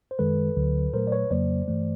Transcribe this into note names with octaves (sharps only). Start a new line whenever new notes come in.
C5
F#2 D#3 G#3 A4 B4
D2 D3 F#3
A#2 F#3 A3 A#4 C5
D5
B4 C#5
F2 C#3 F#3 A#3 C5 D5
G2 E3 A3